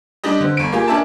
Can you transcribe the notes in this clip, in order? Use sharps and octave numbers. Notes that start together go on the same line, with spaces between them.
G3 D4 G4 D#5
D3 C4
G1 D7
A#3 F4 G4 G#4
C#4 D4 A#4 E5 G#5 A5